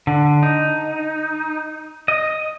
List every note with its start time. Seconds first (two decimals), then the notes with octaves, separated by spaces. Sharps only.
0.07 D3
0.43 D#4
2.08 D#5